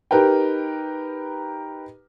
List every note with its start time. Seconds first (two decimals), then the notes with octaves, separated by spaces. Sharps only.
0.11 D#4 G4 A#4 B4 G5